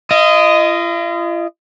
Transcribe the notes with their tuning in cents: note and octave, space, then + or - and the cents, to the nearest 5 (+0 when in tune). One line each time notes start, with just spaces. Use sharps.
F4 -45 D#5 +0